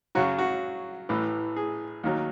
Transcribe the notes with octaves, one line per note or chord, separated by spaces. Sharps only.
F#2 C#3 F#3 F#4
F#4
A1 A2 E3
G#4
D#2 D#3 F#3